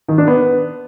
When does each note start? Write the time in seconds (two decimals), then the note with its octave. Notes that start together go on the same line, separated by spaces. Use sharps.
0.08 D#3
0.18 D4
0.27 B3